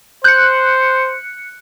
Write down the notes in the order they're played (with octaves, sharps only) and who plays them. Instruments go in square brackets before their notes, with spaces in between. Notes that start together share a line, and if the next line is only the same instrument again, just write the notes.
[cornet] C5 [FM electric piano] F#6 C#7 [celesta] G6